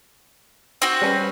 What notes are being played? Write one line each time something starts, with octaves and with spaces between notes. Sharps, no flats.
C4 F#4
G3 C#4 B4